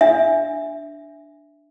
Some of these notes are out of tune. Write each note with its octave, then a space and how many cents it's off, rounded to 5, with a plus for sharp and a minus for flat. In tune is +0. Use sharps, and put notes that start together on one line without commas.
D4 +0 E5 +0